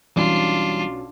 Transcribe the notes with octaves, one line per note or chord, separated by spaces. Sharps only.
B1 B2 E3 G3 C#4 D4 F4